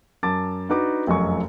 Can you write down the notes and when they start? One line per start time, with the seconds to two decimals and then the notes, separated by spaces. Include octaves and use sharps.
0.23 F#2 A5 D6 A6
0.69 D4 D#4 F#4 B4 D6
1.07 F1 F#2 F3 D#5 G#5 C#6